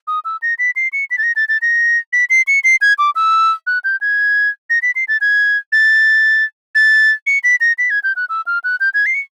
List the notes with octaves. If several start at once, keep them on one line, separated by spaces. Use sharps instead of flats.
D#6
E6
A#6
B6
C7
C#7
B6
A6
A#6
A6
A6
A#6
B6
C7
C#7
C7
G#6
D6
E6
F#6
G6
G#6
A#6
B6
C7
A6
G#6
A6
A6
C#7
B6
A#6
B6
G#6
G6
F#6
E6
F6
F#6
G6
G#6
C7
C#7